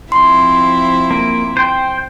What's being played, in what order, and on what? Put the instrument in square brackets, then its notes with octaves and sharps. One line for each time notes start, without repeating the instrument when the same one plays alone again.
[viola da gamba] F3 C4 E4 [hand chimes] C6
[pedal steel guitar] A#3
C5 G5